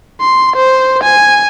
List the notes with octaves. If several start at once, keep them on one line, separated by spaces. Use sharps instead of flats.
C6
C5
G#5